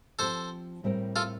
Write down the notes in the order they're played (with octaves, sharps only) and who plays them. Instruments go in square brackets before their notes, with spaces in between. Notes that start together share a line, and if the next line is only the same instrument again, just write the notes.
[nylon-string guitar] F3 C4 G4 [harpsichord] A4 C5
[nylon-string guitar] A2 G3 C4 G4 A#4
[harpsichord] F4 A4